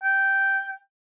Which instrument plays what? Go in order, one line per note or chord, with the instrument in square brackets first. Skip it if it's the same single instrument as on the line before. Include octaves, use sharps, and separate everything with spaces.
[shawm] G5